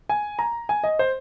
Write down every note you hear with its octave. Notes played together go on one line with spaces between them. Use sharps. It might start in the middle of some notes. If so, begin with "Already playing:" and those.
G#5
A#5
G#5
D#5
C5